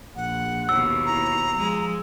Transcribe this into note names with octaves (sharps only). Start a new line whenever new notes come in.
A#1 F#5
D#2 B2 E6
E4 A#5
F3 G#3